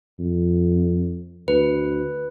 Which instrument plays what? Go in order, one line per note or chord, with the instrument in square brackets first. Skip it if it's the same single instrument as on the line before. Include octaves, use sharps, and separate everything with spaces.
[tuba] F2
[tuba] D2 [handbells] B4